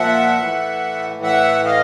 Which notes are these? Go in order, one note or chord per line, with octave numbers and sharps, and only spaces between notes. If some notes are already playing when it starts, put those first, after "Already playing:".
Already playing: A#2 F3 E5 F#5
A2 E3
E5 F#5
D#5 F5